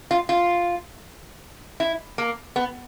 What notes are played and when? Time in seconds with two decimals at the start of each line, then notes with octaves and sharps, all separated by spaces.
0.11 F4
0.29 F4
1.80 E4
2.18 A#3
2.56 B3